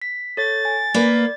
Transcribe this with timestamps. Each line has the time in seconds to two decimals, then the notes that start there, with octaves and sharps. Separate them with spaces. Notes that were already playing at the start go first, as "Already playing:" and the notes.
0.02 B6
0.37 A4 C#5 A6
0.65 G#5
0.94 A#3 B4 D5